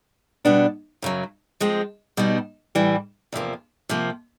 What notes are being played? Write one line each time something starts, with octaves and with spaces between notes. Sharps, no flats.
B2 G3 B3 D4
F#2 C#3 F#3
F3 G#3 C4
B2 G3 B3 D#4
A2 E3 G3
E2 C3 F3 A#3
C3 F3 A#3